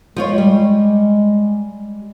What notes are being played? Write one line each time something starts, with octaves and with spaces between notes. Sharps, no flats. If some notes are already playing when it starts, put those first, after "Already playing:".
F3 G#3 F4 C#5
G3